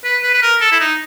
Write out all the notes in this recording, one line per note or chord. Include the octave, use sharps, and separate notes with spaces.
B4
B4
B4
A#4
A4
E4
D#4